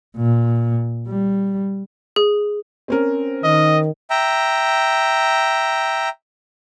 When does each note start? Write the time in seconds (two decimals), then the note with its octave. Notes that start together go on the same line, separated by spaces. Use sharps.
0.16 A#2
1.07 G3
2.16 G#4
2.88 C4 C#4 A#4
3.44 D#3 D#5
4.10 E5 G5 A#5